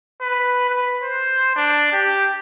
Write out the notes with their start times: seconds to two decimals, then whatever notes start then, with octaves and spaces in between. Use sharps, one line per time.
0.21 B4
0.70 B4
1.03 C5
1.56 D4
1.93 G4